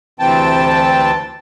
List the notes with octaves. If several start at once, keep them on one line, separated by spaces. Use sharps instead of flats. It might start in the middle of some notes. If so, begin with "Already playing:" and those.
D2 C3 E3 C4 G5 A5